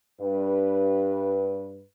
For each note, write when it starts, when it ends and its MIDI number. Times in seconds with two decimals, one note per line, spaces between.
0.21 1.82 43
0.21 1.82 71